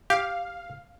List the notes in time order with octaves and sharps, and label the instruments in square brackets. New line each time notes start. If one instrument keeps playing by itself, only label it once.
[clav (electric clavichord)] G4 [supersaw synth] F5